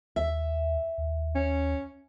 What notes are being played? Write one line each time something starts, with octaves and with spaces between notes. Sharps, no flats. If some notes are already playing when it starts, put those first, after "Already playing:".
D#2 E5
D#2
C#4